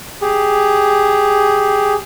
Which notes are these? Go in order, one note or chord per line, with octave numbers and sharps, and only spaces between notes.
G4 G#4